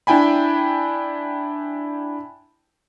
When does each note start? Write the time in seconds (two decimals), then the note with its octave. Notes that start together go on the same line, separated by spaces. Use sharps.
0.07 D4 E4 G5 G#5 B5